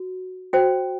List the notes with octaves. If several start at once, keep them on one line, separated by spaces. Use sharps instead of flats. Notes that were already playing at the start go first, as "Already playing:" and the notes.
Already playing: F#4
F#4 C5 G5